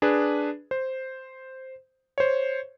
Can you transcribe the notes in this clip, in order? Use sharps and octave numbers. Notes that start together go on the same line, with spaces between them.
D4 G#4 B4
C5
C5 C#5